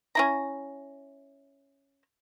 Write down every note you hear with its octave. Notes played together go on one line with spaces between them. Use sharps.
C#4 E4 A#5